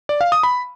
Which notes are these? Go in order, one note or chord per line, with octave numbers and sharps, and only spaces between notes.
D5
F5
D#6
B5